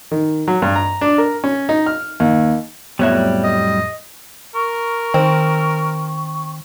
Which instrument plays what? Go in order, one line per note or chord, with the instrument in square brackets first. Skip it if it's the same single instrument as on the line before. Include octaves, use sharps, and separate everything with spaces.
[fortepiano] D#3
F#3
G2
A#5
D4
A#4
C#4
D#4
F6
D#2
[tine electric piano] F2 A2 F#3 [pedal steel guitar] G3 F#6 [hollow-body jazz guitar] B3 C#5 E5
[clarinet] D#5
[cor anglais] A#4 [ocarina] C#6
[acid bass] D#3 [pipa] C4